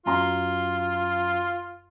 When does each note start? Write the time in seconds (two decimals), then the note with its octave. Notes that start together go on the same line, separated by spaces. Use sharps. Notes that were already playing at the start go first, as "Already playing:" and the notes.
0.06 F#2 F4 A#5 C6